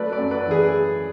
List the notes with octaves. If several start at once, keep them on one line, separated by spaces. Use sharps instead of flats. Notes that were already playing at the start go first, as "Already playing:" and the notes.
Already playing: F#3 A3 B4 D5
B4 D5
F#2
B4 D5
E3
G#4 B4